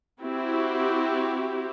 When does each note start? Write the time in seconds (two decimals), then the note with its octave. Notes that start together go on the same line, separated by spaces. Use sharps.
0.22 C4 E4 F#4 G4